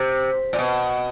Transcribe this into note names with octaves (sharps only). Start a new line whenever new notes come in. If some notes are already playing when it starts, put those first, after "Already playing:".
Already playing: C3
A#2
B2